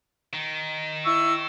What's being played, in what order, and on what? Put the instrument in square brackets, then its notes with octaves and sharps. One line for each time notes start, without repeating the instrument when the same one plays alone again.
[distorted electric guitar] D#3
[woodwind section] E4 C#6 E6